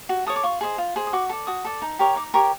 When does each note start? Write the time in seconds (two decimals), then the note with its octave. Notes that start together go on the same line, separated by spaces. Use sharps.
0.09 F#4
0.26 A4 C#5 D#6
0.36 D6
0.43 F4 C#6
0.61 G#4 C5 D#5
0.78 F4
0.96 G#4 C5 D#5
1.07 D#6
1.13 F#4 D6
1.30 A4 D5
1.47 F#4 D#6
1.65 A4 D5
1.82 D#4
1.99 G4 A#4 C#5
2.16 D#4 D6
2.34 G4 A#4 C#5 C#6